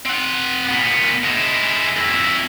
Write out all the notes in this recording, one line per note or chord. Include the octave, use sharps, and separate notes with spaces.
C4 F#5
A#2 B3
G#3 E4
F2 E4